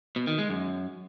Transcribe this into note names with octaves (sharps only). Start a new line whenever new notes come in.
B2
D#3
G#3
F#2